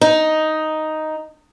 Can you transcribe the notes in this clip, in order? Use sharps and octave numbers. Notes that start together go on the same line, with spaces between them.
D#4